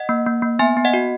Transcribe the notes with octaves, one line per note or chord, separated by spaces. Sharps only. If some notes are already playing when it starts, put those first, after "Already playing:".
Already playing: D#5 F#5
A#3
A#3
A#3
B3 E5 G#5
B3
D#5 F#5
F#4